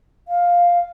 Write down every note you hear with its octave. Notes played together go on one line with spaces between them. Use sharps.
F5